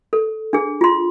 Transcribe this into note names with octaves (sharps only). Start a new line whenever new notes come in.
A4
D4 G#4
F4 C6